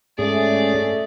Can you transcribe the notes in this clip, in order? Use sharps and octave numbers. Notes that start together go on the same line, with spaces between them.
G#2 A3 C#4 G#4 D5